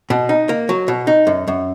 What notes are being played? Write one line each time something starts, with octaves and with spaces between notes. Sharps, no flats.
B2
D#4
A#3
F#3
B2
D#4
F#2
F#2